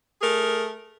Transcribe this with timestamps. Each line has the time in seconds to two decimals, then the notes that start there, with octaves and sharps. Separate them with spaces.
0.21 A3 G#4 A#4